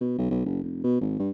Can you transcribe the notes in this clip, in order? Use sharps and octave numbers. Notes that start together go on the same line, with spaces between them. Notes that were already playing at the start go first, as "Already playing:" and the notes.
B2
B1
B1
F#1
F1
B2
G#1
G2